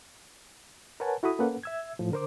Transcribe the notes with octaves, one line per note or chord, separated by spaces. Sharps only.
A#4 B4 C#5 F#5 G#5 A5
E4 F#4 A4 B5 D#6
A#3 C#4 A4 B4 F#5
E5 E6 G#6
A2 F3
D3 A#4 C5 D6